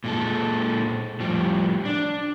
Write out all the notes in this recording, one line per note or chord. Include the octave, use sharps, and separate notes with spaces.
A#2 G#3 A4
A2 F3 G3
D4